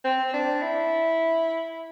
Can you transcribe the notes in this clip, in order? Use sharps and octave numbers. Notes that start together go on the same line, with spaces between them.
C4
D4
E4